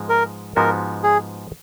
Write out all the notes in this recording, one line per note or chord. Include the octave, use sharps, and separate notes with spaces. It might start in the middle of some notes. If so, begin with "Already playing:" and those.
Already playing: G#2 F3 G#3 B3
A#4
G#2 F3 G#3 B3 F#4 A#4
G#4